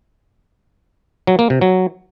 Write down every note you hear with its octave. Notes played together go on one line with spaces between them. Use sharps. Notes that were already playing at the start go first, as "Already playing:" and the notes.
F#3
A#3
C3
F#3